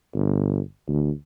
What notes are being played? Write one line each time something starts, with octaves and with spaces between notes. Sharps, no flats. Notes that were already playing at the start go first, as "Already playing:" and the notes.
G1
D2